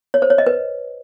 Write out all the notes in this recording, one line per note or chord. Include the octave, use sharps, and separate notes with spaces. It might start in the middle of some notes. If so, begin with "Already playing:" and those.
C#5
C5
C#5
D#5
B4